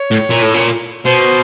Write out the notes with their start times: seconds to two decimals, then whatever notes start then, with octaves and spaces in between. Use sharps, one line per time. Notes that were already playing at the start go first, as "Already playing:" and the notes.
Already playing: C#5
0.11 A2
0.30 A#2
0.42 A2
0.54 A#2
1.05 B2 C5